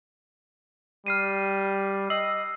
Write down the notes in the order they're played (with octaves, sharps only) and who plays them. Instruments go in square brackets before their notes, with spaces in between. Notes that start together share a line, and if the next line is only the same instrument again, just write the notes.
[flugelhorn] G3 [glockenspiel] F6 C7 D#7
[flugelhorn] D#5 [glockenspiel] E6 C7 F#7